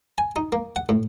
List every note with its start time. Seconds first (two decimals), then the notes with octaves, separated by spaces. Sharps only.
0.18 G#5
0.36 D#4
0.52 A#3
0.76 F#5
0.89 A2